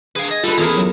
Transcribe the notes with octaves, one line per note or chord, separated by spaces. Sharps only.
G#4 B4 F5 G#5
D#5 G#6
G3 F4 A4 B4
E2 C#4 E4 G#4 A#4
F#3